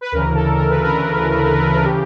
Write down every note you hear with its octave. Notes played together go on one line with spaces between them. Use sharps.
B4
D2 C#3 E3 A#4
A4
A#4
B4
A#4
C#3 E3 G4